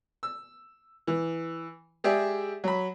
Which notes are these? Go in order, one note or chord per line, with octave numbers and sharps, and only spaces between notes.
E6
E3
G#3 G4 G#4 D5 E5
F#3 B5